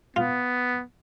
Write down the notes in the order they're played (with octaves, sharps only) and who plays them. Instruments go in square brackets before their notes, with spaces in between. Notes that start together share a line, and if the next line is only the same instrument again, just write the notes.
[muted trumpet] B3 [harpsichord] F4